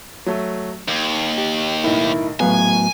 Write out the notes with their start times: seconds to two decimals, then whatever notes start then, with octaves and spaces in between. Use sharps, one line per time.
0.26 F#3 A3
0.88 D#2 F7
1.38 G4
1.84 B1 A2 D#3 E4
2.40 D#1 A2 F#3 B3 B4 F5 G#5